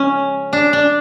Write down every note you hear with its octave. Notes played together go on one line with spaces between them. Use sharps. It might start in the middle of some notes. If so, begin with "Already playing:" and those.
Already playing: C#3 F3 G#3 C#4
D4
D4